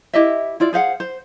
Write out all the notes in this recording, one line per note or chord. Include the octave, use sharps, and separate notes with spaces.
E4 G4 D#5 E5
E4 F4 D5
G#4 C5 F5 F#5
C5